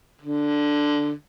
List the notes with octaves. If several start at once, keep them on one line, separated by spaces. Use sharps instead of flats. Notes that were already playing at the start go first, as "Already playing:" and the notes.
D3